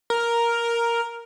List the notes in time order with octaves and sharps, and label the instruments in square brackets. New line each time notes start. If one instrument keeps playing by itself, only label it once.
[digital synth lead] A#4